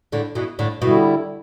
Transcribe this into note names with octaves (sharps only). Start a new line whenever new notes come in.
A2 D3
B2 E3
A2 D3
B2 D3 G3 E4